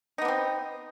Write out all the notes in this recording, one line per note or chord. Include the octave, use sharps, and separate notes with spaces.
B3 C4 D4 D#4